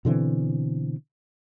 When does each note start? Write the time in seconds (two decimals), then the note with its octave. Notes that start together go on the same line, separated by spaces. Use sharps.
0.05 B2 D3 E3 C4